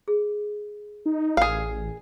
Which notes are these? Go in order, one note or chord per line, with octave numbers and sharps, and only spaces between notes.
G#4
D#4
A1 G#4 A#4 D5 F5